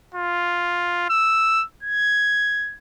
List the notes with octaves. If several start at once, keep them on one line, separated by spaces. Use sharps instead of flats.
F4
E6
G#6